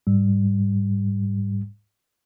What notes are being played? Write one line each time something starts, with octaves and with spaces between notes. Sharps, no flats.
G#2 G3